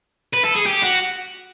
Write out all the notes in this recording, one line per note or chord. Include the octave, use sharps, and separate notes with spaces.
B4
A4
G#4
G4
F#4